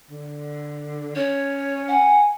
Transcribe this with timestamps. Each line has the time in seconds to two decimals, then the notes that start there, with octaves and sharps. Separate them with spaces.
0.11 D3
1.16 C#4 C#5
1.88 F#5 G#5